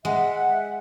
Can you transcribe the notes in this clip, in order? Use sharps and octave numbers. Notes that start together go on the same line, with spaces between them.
G#3 E5 F#5